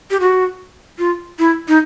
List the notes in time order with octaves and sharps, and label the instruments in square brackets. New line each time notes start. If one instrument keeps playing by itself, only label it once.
[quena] G4
F#4
F4
E4
D#4